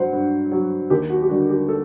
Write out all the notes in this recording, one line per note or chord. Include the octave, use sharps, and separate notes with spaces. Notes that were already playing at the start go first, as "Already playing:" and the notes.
Already playing: G2 F#3 C5 F#5
G2
F#3
D#2 G4
F#4
G4
D3 G3 F#4
G4
A4